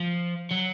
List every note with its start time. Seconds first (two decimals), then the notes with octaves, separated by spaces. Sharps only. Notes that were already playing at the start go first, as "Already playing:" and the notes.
Already playing: F3
0.51 F#3